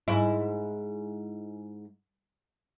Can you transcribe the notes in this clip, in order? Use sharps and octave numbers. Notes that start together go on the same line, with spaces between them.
G#2 E4